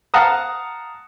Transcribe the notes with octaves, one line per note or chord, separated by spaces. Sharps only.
F5 F#5 A5 A#5 D#6